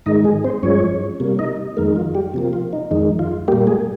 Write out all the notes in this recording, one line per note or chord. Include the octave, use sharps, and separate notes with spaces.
G#2 D#3 G#3 D#4 D#5
G#3 G#4
C4 C5
G2 F3 G#3 C#4 C#5
C3 G3 A#3
D#4 D#5
F2 D#3 G#3 A#3 A#4
F4
G3 G4
C3 F3 A#3
F4
D#4
F2 D#3 G#3 D#4
F4
A#2 G3 A#3 G4
G#3 G#4